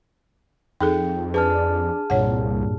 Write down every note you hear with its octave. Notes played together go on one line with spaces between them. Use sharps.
F2 D#4 G#4 A4 G5
D4 G#4 B4 A5 F6
C2 G2 A#2 C#5 F#5